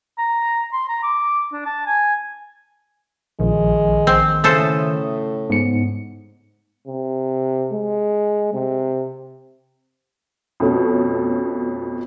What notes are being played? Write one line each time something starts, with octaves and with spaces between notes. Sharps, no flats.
A#5
C6
A#5
D6
D4
A5
G#5
A#1 D#3 G#3
C4
A2 C#3 A4 C5 E5 D#6
G#2 B3 C#7
C3
G#3
C3
F2 B2 A3 C#4